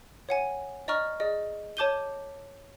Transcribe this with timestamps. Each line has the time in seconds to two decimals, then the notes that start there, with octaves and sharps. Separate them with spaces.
0.29 C#5 F#5 G#5
0.88 D5 D#5 A#5 C#6 F6
1.20 G#4 D5 D#5
1.77 C#5 A5 D6 G6 D#7 G7